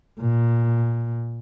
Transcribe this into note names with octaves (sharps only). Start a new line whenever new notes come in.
A#2